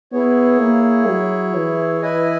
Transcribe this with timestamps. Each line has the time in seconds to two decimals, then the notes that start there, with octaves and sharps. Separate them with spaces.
0.12 B3 E4 G#4 C#5
0.60 A#3
1.07 F#3
1.55 E3
2.01 E4 B4 D#5 G#5